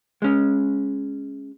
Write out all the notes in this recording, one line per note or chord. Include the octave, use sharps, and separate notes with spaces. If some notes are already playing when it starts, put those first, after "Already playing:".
G#3 C#4